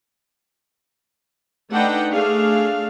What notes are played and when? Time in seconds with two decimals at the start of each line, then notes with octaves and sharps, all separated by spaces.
1.72 A3 D4 D#4 B4 F#5 G5
2.10 A3 D4 G#4 F5